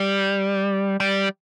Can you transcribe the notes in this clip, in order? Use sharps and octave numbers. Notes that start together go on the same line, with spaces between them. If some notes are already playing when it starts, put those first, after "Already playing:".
Already playing: G3
G3